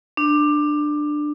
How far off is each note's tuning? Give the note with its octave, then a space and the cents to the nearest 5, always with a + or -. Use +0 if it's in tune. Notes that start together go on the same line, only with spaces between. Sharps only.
D4 +15